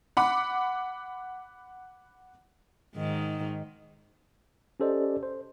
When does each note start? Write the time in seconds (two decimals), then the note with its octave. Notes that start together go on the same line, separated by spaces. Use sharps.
0.17 F#5 B5 D6
2.96 G#2 D#3
4.80 C#4 G4 A4 C5 D5 D#5
5.23 C5